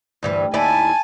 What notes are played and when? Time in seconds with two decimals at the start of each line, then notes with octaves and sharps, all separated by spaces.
0.23 D2 G2 E3
0.54 D#2 E4 D5 G#5 A5